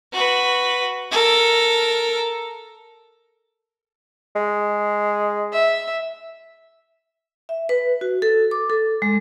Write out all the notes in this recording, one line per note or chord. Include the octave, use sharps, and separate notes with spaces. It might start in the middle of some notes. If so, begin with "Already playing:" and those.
F#4 B4
A4 A#4
G#3
E5
E5
B4
F#4
A4
D6
A4
G#3